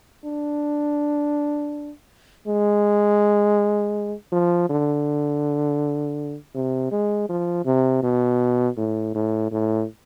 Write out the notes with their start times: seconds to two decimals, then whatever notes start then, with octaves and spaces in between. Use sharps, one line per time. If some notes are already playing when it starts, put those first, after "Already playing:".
0.25 D4
2.47 G#3
4.32 F3
4.70 D3
6.55 C3
6.91 G#3
7.29 F3
7.65 C3
8.03 B2
8.77 A2
9.15 A2
9.51 A2